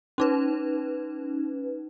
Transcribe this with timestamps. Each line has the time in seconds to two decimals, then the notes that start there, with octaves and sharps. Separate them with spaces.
0.18 C#4 D#4 B4